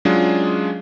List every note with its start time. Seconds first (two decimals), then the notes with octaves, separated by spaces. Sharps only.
0.05 F#3 G#3 C#4 D4 F4 G#4